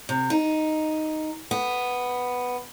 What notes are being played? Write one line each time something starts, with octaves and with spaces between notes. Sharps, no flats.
C3
D#4
B3